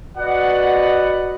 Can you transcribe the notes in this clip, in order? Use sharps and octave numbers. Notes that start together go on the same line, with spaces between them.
F#4 B4 D5 D#5 F#5